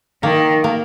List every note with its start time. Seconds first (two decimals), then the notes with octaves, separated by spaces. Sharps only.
0.23 D#3 A#3
0.64 A#3